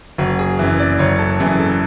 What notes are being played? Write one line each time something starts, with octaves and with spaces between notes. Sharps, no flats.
F#1 F#4
G#4
F#2 E3
D5
F#1 C#5
A4
F#2 E3 G#4
A4